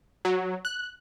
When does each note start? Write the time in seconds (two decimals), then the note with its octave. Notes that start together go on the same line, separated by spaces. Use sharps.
0.25 F#3
0.65 F#6